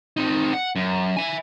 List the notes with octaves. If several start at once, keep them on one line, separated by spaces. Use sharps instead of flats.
C4 D#4
F#5
F#2
E5 G#5